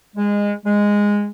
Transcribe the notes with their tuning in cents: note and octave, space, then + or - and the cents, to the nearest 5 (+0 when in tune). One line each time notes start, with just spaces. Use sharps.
G#3 -20
G#3 -10